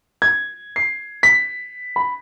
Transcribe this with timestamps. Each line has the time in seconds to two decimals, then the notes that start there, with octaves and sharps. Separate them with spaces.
0.22 G#6
0.76 C7
1.23 B6
1.96 B5